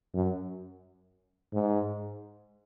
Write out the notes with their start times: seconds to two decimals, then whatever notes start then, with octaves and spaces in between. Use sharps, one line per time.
0.14 F#2
1.53 G#2